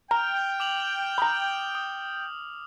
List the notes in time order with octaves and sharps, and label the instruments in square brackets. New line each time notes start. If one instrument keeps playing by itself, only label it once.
[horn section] G5 [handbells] A#5 [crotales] F6 F7
[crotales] D6 F7 F#7
[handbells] A#5 B5 [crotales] D#6
[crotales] D#6